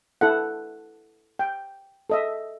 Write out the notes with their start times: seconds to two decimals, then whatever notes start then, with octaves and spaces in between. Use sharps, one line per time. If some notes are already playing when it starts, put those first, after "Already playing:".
0.21 E4 A4 F#5
1.39 G5
2.10 A4 D#5 E5